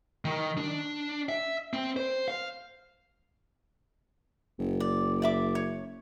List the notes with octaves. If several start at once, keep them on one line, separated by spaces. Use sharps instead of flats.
D#3
D4
E5
C4
C5
F5
F#1
D5
D5 E5 D6
C#5